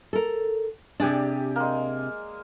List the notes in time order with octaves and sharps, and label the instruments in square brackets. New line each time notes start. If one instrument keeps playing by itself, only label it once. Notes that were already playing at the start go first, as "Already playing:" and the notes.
[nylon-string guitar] A4 A#4
[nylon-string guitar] C3 D4 [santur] G4 G#4 D5
[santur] G#3 A#3